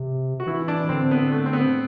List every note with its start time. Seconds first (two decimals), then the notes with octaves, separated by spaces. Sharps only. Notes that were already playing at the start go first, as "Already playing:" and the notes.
Already playing: C3
0.40 F#4
0.46 E3 E4
0.68 D4
0.89 D3 C4
1.11 B3
1.32 A3
1.46 C4
1.53 B3